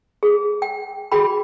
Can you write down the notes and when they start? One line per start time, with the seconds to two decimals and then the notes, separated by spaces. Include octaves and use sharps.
0.23 G#4
0.62 G5
1.12 F#4 G#4 G5 B5